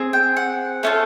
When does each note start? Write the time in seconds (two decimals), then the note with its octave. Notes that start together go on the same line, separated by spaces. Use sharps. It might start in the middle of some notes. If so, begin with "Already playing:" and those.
Already playing: C4 G#4
0.13 G5
0.37 F#5
0.83 A3 C#4 F4 A4